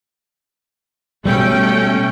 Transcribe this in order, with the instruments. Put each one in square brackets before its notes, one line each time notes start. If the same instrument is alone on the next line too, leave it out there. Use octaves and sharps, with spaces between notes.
[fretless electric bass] B2 G3 [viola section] A3 C#4 G5